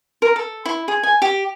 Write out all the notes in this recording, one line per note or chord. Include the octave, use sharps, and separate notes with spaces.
A#4
A4
E4
G#4
G#5
G4